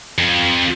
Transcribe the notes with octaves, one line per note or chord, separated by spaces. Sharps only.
F2